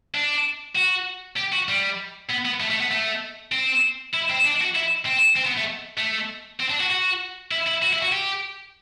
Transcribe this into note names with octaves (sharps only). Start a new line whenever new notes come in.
D4
F#4
G4
F#4
G3
B3
B3
A3
A3
B3
A3
C4
E4
C4
D4
F#4
E4
C4
C4
B3
A3
A3
C4
D4
F#4
F#4
E4
E4
F#4
E4
F#4
G4